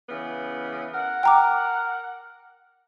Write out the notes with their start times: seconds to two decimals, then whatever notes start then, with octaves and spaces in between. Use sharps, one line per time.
0.09 C#3 E3 B3
0.94 A#4 F#5
1.23 G5 A#5 D6